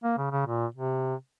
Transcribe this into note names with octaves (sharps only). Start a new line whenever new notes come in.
A#3
C#3
C#3
A#2
C3